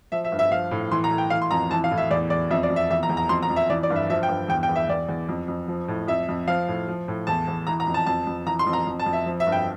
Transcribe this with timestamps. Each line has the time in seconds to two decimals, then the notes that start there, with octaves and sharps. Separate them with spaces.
0.12 F3 E5
0.25 E5
0.32 G2
0.39 E5
0.52 F3 F5
0.71 A2
0.91 E3 C6
1.04 A#5
1.11 A2
1.18 G5
1.30 E3 F5
1.42 C6
1.51 F2 A#5
1.71 E3 A5
1.84 F5
1.91 A2
1.98 E5
2.11 E2 D5
2.30 E2 D5
2.51 F2 E5
2.63 D5
2.70 F2
2.76 E5
2.90 E2 E5
3.03 A#5
3.09 E2
3.17 A#5
3.29 F2 C6
3.42 A#5
3.50 F2
3.56 E5
3.70 E3 D5
3.83 D5
3.90 G2
3.96 E5
4.10 F3 E5
4.23 G5
4.29 G2
4.49 E2 G5
4.63 G5
4.69 E2
4.76 E5
4.89 E2 D5
5.09 E2
5.29 F2
5.48 F2
5.68 F3
5.88 A2
6.08 F2 E5
6.29 F2
6.47 F3 F5
6.68 A2
6.88 F3
7.08 A2
7.27 E2 A5
7.48 E2
7.67 E3 A#5
7.80 A#5
7.87 F2
7.94 A5
8.06 F2 A5
8.27 F2
8.46 E3 A#5
8.59 C6
8.67 F2
8.73 A#5
8.87 F2
9.00 A5
9.06 F2
9.13 E5
9.26 F3
9.40 E5
9.47 G2
9.52 G5